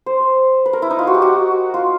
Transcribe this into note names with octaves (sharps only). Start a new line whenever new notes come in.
C5
B4
A#4
E4
D#4
F4
F#4
G4
F#4
F4